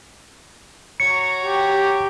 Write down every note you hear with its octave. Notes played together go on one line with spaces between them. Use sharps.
F#4 C#5 A#5 C#7
G4